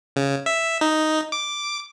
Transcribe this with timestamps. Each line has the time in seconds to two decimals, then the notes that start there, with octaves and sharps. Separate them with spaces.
0.16 C#3
0.46 E5
0.81 D#4
1.32 D6